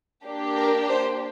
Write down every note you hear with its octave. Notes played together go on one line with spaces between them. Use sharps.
A#3 D4 G4
A#4
C5